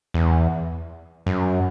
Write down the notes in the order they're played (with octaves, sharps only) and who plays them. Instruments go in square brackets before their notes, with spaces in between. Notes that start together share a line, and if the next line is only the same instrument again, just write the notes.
[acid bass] E2
F#2